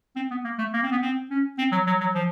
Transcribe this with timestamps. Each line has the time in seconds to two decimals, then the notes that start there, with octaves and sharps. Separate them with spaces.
0.16 C4
0.31 B3
0.44 A#3
0.58 A3
0.73 A#3
0.83 C4
0.92 B3
1.02 C4
1.30 C#4
1.59 C4
1.72 F#3
1.87 F#3
2.00 F#3
2.15 F3